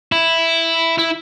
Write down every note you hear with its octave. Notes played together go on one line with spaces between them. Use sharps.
E4
E4